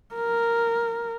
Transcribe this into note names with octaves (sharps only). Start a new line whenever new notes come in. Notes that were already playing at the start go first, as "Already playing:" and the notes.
A#4